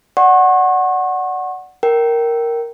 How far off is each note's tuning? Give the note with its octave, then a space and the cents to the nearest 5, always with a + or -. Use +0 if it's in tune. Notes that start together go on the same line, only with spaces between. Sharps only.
D5 +0 F#5 +0 C#6 -35
A#4 +0 G5 -20